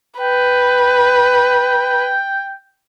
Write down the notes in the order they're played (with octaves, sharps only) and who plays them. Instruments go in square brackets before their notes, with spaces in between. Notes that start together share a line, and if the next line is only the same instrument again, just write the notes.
[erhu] B4 [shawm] G5